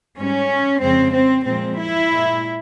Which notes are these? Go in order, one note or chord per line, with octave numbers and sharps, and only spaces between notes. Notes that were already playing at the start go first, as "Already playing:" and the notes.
G#2 G3 C#4
F2 C#3 F3 G#3 C4
C4
A#2 F3 G#3 C4
E4
A#2 G#3